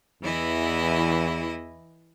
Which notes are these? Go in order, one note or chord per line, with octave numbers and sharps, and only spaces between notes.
E2 E3 E4 D#5